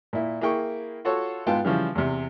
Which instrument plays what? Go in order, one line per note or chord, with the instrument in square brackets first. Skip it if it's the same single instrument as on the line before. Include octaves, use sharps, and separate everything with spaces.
[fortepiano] A#2 E4
A#3 E4 G#4 G5 C#6
F4 F#4 A4 C#5
G#2 B3 F4 F5 G5 A5
C#3 E3 F3 G3
E2 C3